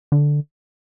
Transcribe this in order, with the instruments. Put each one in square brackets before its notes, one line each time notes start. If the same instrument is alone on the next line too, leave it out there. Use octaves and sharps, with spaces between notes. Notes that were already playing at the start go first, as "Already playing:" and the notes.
[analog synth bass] D3